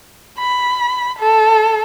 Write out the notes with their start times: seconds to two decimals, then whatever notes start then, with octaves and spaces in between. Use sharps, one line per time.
0.39 B5
1.19 A4